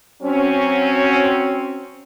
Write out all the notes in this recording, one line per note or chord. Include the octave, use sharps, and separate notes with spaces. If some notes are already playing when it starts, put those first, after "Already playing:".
F#3 C4 C#4